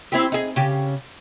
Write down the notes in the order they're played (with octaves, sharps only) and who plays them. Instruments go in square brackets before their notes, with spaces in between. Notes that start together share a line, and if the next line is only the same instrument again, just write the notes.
[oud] C4 E4 G4
D#4 G#4
C#3 G4